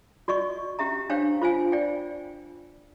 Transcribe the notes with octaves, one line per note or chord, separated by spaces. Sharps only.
F#4 D5 D#5 C#6
C#4 G4 E5 A#5
D4 C5 C#5 F5 G5
F4 C5 F5 G#5
D5 G5